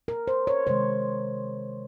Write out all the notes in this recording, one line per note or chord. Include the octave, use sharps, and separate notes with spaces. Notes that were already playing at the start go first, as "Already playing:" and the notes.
A#4
C5
C#5
C3 D#3 G#3 C5